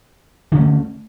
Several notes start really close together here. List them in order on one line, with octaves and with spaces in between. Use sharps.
D3 C#4 A3